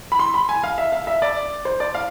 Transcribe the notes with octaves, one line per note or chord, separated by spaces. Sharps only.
B5
C6
B5
G#5
F5
E5
F5
E5
D5
C5
D5
F5